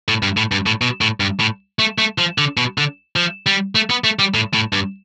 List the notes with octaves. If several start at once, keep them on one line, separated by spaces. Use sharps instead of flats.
A2
G2
A2
G2
A2
B2
A2
G2
A2
A3
A3
F3
D3
B2
D3
F3
G3
A3
B3
A3
G3
A2
A2
G2